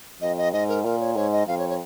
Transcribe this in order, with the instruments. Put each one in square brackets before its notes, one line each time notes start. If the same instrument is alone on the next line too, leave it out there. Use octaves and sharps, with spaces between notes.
[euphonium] F2 [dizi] D#5
[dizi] D#5
[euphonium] G#2 [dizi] D#5
[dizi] A#4
[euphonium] A#2 [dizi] A#4
[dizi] C#5
[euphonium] G#2 [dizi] C#5
[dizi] D#5
[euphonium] F2 [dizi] F5
[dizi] C#5
C#5